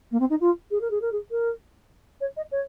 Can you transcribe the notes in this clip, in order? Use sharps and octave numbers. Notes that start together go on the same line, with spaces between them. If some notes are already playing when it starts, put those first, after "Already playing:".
A#3
C4
D#4
F4
G#4
A#4
G#4
A#4
G#4
A#4
C#5
D#5
C#5